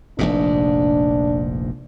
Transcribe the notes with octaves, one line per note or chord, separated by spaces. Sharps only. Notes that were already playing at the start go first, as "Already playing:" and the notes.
F1 A#1 G#2 D4